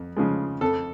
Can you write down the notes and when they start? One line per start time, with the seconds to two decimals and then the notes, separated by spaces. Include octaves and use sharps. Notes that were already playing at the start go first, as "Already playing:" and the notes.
Already playing: F2
0.17 C#3 F3 G#3
0.61 F2 A4